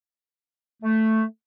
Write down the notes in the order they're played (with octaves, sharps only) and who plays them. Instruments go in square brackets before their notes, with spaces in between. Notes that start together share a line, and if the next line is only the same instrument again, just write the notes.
[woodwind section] A3